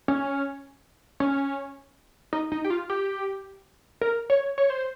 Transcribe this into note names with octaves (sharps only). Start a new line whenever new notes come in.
C#4
C#4
D#4
D#4
G4
F4
G4
A#4
C#5
C#5
C5